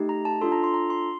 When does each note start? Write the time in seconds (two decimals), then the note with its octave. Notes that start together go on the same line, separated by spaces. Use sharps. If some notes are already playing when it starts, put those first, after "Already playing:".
Already playing: A3 D#4 G4
0.09 A#5
0.25 A5
0.41 D4 F4 A4 C6
0.52 A#5
0.64 C6
0.74 A#5
0.90 C6